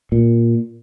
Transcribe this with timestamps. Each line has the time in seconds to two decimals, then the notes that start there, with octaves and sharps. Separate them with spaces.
0.12 A#2